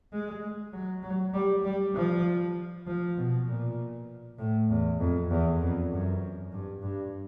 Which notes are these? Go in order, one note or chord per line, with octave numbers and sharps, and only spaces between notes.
G#3
F#3
F#3
G3
G3
F3
F3
B2
A#2
A2
E2
F2
E2
F2
F#2
G2
G2